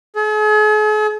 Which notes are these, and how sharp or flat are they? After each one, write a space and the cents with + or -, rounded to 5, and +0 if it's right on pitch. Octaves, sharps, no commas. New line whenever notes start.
G#4 +45